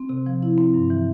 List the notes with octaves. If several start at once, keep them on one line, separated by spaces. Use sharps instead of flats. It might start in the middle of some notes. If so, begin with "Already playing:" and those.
Already playing: C4
C3
F3
E4
C4
G2
E3